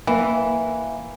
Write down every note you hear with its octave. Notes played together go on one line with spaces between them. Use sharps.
E3 A#3